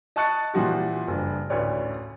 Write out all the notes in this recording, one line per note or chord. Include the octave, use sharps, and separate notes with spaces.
D#5 A5 C#6 F#6 A6 C#7
A#2 E3 F3 F#4 G4
F#1 G2
A1 D2 B4 C#5 D5